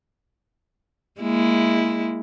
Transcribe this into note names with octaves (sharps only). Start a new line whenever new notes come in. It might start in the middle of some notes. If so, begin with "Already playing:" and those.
G#3 A#3 E4